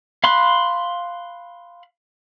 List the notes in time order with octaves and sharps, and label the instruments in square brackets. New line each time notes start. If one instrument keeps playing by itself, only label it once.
[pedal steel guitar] F5 B5 C6 F#6